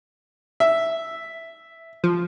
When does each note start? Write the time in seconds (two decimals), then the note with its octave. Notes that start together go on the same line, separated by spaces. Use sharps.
0.60 E5
2.04 F3